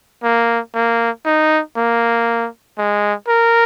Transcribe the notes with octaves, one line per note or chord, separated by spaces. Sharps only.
A#3
A#3
D#4
A#3
G#3
A#4